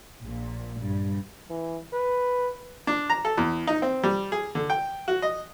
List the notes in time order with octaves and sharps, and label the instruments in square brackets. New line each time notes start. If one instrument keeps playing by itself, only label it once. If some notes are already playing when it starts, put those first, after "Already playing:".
[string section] A#1 A#2
G2
[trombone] E3
B4
[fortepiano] D4
A#5
A4
E2
D#4
C4
G3
G#4
D3
G5
F#4
D#5